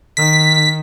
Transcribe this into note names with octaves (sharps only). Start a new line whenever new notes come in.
D#3 B6